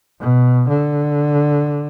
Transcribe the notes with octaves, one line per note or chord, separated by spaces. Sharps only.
B2
D3